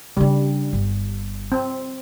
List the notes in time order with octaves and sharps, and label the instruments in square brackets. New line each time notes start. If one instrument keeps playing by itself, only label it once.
[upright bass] C#3 D4 [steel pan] G3
[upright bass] G1
[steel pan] C4